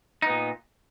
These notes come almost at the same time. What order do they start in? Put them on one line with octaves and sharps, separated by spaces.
D#4 B3 A#2